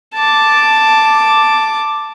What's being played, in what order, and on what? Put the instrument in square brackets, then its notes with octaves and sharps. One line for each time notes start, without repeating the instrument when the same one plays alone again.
[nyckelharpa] A5 D6